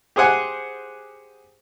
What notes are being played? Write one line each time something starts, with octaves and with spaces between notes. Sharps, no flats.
G4 G#4 C5 F#5 G#5